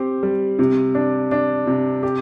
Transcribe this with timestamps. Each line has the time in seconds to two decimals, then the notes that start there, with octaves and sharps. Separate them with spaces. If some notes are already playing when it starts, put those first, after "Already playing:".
Already playing: C4 G4
0.23 G3
0.59 C3
0.95 D4
1.31 D4
1.67 C3
2.03 G4